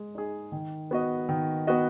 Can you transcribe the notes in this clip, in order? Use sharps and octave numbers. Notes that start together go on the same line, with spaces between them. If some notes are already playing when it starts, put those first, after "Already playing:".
Already playing: G#3
D#4 G#4
D#3
B3 F#4 D#5
D#3
B3 F#4 D#5